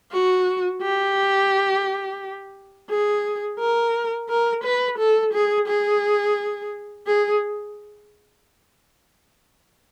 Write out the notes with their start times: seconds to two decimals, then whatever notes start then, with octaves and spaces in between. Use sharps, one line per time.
0.12 F#4
0.82 G4
2.90 G#4
3.59 A#4
4.29 A#4
4.64 B4
4.99 A4
5.33 G#4
5.68 G#4
7.07 G#4